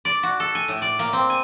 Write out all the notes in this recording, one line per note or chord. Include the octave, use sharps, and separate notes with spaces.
D5
F#4
A4
G#5
A2
D5
A#3
C4
G#5